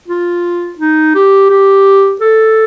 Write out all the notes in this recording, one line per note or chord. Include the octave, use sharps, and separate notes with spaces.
F4
D#4
G4
G4
A4